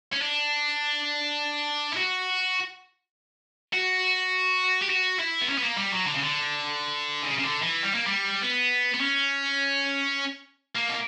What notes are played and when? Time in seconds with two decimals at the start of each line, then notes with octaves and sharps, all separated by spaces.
0.13 C#4
0.22 D4
1.93 E4
1.97 F#4
3.73 F#4
4.82 G4
4.90 F#4
5.20 E4
5.41 B3
5.49 C#4
5.58 B3
5.62 A#3
5.77 G3
5.92 F#3
6.07 D3
6.14 C#3
6.22 D3
7.23 C#3
7.39 C#3
7.44 D3
7.63 E3
7.83 G3
7.95 A#3
8.07 G3
8.42 B3
8.94 B3
9.00 C#4
10.75 A#3
10.88 B2